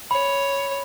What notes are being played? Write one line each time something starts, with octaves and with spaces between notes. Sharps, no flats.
C#5 B5